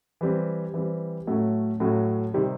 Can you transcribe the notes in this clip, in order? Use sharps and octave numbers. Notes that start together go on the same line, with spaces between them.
E3 G3 C4
E3 G3 C4
A2 F#3 A3 C#4
A2 F#3 A3 C#4
C3 D#3 G3